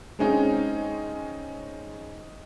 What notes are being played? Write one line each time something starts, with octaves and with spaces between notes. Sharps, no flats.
G#3 C4 C#4 D#4